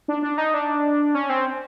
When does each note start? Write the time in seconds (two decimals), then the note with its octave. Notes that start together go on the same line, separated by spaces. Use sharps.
0.08 D4
0.22 D4
0.38 D#4
0.54 D4
1.15 C#4
1.30 C4